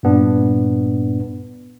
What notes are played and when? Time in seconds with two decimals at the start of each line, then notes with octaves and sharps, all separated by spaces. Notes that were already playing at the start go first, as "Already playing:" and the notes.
0.03 G2 A#2 B3 D4